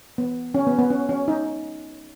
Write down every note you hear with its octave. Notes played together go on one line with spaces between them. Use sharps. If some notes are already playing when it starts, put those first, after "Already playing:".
B3
C#4
B3
B3
C#4
C#4
D#4